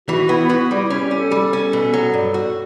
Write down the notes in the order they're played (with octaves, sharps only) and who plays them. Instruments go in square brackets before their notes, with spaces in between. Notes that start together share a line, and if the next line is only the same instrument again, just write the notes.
[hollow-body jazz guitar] E3 [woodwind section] F#4
[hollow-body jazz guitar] B3 [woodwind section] E4
[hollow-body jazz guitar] B3 [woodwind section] F#4
[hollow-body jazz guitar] G3 [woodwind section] E4
[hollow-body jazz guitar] C#4 [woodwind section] E4
[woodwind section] G4
[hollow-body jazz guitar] C#4
[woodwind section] A4
[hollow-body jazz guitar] G3
C#4
B2
F#3
G2
F#4